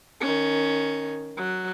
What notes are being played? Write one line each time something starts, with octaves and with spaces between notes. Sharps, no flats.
D#3 C#4
F#3